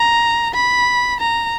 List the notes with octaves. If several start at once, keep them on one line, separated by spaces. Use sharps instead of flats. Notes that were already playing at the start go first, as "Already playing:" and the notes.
Already playing: A#5
B5
A#5